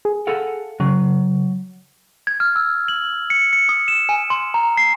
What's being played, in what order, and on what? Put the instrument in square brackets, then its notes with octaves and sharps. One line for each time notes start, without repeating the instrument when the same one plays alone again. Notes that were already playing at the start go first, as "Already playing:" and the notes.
[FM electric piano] G#4
[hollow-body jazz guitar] A4 F5 F#5
[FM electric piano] C#3 [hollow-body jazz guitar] F#3
[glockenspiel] G#6
F6
E6
F#7
C#7
C#7
D#6
E7
G#5
C6
A#5
C7